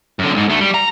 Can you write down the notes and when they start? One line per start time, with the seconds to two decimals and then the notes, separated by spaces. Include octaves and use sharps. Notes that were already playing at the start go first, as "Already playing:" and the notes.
0.19 F#2 D3
0.34 C2 G#2
0.48 D2 A3
0.61 G3
0.74 A#5